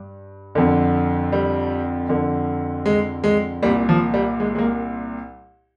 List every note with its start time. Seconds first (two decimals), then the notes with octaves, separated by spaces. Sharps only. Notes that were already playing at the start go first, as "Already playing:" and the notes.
Already playing: G2
0.55 F2 D3
1.32 G3
2.09 F2 D3
2.86 G#3
3.24 G#3
3.63 C2 A#2 G3
3.89 F3
4.14 G3
4.40 G#3
4.55 G#3
4.59 A#3